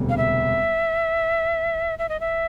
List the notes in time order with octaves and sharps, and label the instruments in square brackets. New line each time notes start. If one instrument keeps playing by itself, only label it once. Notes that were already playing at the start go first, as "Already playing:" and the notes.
Already playing: [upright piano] E1 D2 C3 G3
[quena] F5
E5
E5
D#5
E5